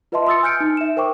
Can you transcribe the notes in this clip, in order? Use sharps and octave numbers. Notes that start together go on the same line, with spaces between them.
F4 B4 D#5 E5 A5 C6
C6 D#6 E6 A6 C#7
G#5 F6 G6 C#7 D7
D#4
E5 E7
A#4 C5 G5 C#6 D6